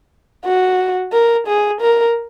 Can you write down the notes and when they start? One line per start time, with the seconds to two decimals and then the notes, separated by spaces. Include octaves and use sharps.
0.45 F#4
1.13 A#4
1.47 G#4
1.81 A#4